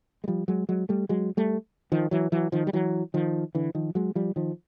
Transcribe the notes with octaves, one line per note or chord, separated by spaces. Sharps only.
G#3
F3 G3
F#3 G#3
F#3 G#3
G3 A3
F#3 G#3
G3 A3
D#3 F3
E3 F#3
E3 F#3
D#3 F3
G3
E3 F#3
D#3 F3
D3 E3
D#3 F3
F#3 G#3
F3 G3
D#3 F3